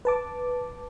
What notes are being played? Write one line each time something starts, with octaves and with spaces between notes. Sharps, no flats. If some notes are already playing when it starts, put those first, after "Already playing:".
B4 A5 D6